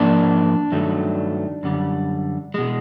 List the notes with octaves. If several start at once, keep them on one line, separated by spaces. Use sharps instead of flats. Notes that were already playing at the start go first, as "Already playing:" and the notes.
Already playing: G#2 F3 A#3 D4
G2 D#3 F#3 A3
F#2 D3 G3
B2 G#3